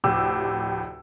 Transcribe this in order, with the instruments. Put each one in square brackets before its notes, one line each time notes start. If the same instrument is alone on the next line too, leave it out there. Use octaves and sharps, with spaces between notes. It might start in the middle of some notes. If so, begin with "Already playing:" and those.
[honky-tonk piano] F1 D2 A2 G4 D6 E6